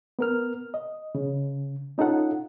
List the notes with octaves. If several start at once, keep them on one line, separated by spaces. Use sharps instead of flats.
B3 A#4 F6
D#5
C#3
C#4 D#4 F4 A4 F#5